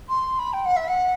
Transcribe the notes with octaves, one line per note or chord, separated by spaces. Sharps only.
C6
B5
G5
F#5
E5
F#5